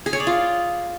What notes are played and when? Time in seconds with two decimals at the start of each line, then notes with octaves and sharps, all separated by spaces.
0.06 G#4
0.13 C#5
0.20 D5
0.27 F4